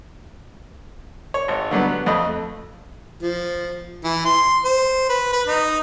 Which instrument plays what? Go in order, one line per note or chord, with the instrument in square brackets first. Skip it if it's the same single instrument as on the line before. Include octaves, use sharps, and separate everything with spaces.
[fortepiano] C#5
G#1
D3 F#3 G3 B3
F2 A3 D#5 B5
[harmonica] F3
E3
C6
C5
B4
B4
D#4